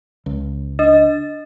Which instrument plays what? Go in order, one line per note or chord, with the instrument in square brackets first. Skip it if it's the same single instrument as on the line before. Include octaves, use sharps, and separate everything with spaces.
[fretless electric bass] C#2
[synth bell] D4 D#5 A6